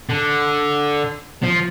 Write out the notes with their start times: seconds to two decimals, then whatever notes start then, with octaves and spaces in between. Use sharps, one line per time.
0.09 D3
1.43 F3